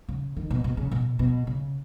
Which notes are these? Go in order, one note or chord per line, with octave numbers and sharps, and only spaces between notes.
C#3
D#3
B2
B2
C#3
B2
B2
C#3